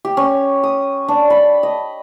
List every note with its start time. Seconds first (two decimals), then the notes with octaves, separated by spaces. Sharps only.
0.05 G4
0.17 C#4
0.63 D#6
1.08 D4
1.30 B5
1.63 D#5